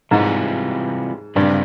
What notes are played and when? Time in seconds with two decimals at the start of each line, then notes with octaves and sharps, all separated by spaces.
0.11 G#2 C3 E3 G3 C#4 F4
1.36 G2 C#3 G3 C4 G4